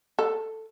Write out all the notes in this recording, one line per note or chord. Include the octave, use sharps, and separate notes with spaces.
A4